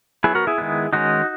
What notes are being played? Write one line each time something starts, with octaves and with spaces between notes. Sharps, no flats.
F#3 B3 E4 G#4
F#4 A#4
E4 G#4
D#3 G#3 B3
D#3 G#3 C#4 D#4 F#4